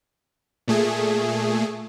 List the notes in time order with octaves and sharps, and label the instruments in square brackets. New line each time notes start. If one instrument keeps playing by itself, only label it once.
[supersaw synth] A#2 A3 G#4